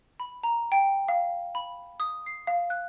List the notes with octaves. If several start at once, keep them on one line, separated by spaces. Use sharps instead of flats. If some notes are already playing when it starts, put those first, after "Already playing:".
B5
A#5
G5
F5
B5
D#6
C7
F5
F#6